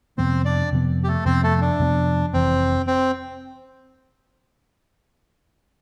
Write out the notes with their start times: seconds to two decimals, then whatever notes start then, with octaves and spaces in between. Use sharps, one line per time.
0.18 F2 C3 F3 B3 C4 C5
0.45 D4 D5
0.72 F2 C3 F3 B3
1.04 G4
1.07 A3 A4
1.25 F2 C3 F3 B3 C4 C5
1.43 A3 A4
1.61 D4
1.79 F2 C3 F3 B3
2.33 F1 F2 E3 C4
2.87 C4